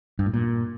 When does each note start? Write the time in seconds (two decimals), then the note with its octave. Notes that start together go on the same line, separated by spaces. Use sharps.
0.19 G2
0.26 A2
0.34 A#2